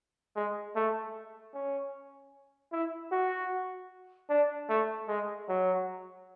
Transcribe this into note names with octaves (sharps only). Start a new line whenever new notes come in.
G#3
A3
C#4
E4
F#4
D4
A3
G#3
F#3